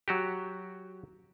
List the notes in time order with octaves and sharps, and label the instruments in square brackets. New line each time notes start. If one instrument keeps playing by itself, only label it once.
[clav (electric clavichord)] F#3 F#4 G4